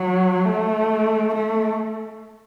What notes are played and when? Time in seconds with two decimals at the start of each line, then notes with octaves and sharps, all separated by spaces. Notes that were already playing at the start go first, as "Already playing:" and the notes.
Already playing: F#3
0.45 A3
1.35 A3